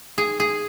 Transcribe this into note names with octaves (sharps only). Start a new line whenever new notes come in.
G#4
G#4